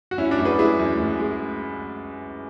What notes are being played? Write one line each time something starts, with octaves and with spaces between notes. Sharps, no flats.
F#4
F#2 C#4 E4
D4 F#4
F#2
G#4 B4
G#3 E4 G#4
F#2
F#2
G#3